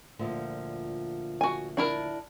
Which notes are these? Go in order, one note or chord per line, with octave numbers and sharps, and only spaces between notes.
D2 A#2 F3
F#4 G#5
D4 E4 A#4